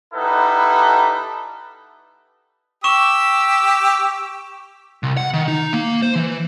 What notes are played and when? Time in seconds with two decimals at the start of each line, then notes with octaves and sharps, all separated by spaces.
0.14 G3 D#4 E4 A4 B4 F#5
2.84 G4 C#6 E6 E7 G7
5.03 C2
5.17 F#5
5.33 D#3
5.48 D#4
5.73 A#3
6.02 C5
6.16 E3